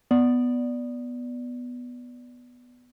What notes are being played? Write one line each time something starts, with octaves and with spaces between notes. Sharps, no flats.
B3 D5